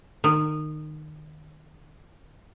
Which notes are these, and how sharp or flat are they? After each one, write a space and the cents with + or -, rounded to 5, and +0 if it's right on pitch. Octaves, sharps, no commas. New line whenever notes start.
D#3 -25